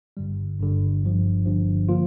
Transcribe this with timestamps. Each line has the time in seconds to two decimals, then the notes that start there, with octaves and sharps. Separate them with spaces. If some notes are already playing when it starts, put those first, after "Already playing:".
0.17 G1 G2 D3 G3
0.60 G1 G2 D3 G3
1.03 G1 G2 F3
1.46 G1 G2 F3
1.89 D3 F3 A#3 F4